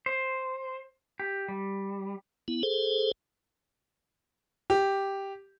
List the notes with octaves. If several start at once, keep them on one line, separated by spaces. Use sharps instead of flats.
C5
G4
G3
B3 E4
G#4 A4 C5
G4